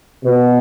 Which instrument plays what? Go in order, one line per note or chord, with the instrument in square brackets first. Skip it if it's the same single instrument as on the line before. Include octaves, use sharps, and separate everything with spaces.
[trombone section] B2